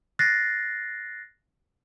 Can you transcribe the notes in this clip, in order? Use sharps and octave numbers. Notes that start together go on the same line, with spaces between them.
F#6 A6 A#6 C7